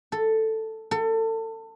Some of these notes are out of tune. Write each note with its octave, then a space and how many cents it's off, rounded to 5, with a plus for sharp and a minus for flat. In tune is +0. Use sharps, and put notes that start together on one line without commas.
A4 +5
A4 +30